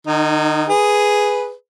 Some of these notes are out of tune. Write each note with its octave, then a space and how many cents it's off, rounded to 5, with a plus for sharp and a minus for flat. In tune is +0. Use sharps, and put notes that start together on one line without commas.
D#3 -45 D#4 +0
G#4 +0 B4 +0